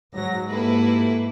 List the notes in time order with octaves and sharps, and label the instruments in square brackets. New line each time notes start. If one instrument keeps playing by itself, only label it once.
[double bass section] G#2 [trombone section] F#3 F#4 [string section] A#6
[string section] A#3 E4 B4 [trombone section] F#4 G4 A4